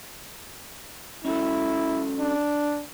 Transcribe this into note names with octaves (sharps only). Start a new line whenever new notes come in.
C#4 E4 F#4 A4
D4